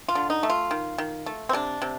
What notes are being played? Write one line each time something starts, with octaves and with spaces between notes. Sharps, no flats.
F4
D3
D#4
A3
F4
D#3
D#3
A3
C4
C3 D4
C3